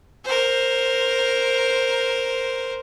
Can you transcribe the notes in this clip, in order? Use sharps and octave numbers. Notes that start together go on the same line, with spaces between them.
A#4 C5